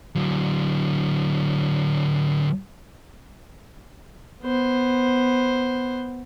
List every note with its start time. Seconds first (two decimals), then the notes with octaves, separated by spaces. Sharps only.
0.16 D3 F#3
4.43 B3 C5